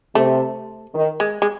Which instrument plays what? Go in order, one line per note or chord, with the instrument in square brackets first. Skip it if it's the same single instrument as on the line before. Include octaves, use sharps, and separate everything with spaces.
[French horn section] C3 [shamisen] A3
[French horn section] D#3
[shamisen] G#3
G#3